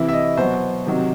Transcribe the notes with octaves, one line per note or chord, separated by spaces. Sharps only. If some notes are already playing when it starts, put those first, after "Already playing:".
Already playing: C3 E3 E4
E5
D#5
B2 F#3 C5
C3 D#3 F#3